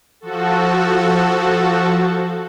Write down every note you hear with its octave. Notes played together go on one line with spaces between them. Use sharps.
F3 F#4 A4